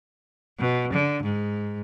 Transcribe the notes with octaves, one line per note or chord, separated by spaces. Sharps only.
B2
D3
G#2